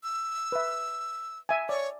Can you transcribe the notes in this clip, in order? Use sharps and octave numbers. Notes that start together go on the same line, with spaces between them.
E6
B4 E5
E5 G#5
C#5 D5